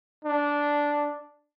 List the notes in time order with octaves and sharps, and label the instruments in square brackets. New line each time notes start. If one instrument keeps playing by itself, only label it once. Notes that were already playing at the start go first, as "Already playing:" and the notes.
[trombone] D4